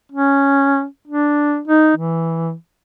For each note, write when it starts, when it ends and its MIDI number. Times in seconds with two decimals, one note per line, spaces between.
0.12 0.85 61
1.07 1.60 62
1.68 1.93 63
1.96 2.53 52